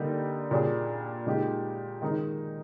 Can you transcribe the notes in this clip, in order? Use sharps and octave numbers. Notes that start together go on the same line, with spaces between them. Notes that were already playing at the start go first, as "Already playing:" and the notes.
Already playing: D3 G3 A#3 D#4 G4
A#2 G3 D4 G#4
A#2 G#3 D#4 G4
D#3 G#3 D#4